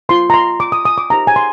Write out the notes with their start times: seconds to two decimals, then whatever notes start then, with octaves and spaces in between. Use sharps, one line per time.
0.09 F4 C5 C6
0.30 A#5
0.34 C6
0.60 D6
0.72 D#6
0.85 D#6
0.98 D6
1.10 D#4 G4 C5 A#5
1.27 G#5
1.36 C6